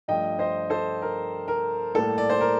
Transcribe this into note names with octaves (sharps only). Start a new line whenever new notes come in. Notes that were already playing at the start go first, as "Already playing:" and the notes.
G2 F3 A3 D#5 G5
C5 D#5
A4 C5
A#4
A#4
A2 G3 A#3 A4
D5
C5
A#4